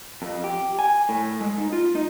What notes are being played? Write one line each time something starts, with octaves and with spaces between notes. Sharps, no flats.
F2
G4
G#5
A2
G#3
D#4
F4
D#4